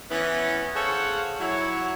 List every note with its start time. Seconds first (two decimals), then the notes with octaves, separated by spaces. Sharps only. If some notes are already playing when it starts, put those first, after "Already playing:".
0.11 E3 B3 C#4
0.75 G#4 A4 C5 C#5 F5 F#5
1.40 F#3 E4 C#5